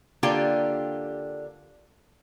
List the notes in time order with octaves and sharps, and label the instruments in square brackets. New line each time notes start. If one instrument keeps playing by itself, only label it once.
[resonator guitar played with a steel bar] D3 A#3 D4 F4 G4 G5